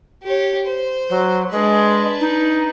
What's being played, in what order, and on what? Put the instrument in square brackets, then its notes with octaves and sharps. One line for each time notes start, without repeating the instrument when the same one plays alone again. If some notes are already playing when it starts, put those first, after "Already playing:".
[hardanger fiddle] G4 C#5
C5
[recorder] F#3
[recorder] G#3 [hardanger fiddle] D4 B4
[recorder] D#4